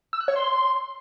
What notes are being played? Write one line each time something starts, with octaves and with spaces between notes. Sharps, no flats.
E6
F#6
C#5
C6